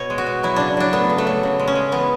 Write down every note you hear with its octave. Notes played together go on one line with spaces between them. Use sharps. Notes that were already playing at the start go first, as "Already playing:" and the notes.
Already playing: B2 C#5
G#3
F#4
B2
F#3 E4
C#3 D4
F#3 D4
A3 B3
C#3
A3
F#3
C#3
G#3
C#4
G#3
E3 B3